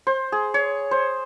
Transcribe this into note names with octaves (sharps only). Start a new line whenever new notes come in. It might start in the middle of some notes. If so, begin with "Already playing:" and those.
C5
G#4
C#5
C5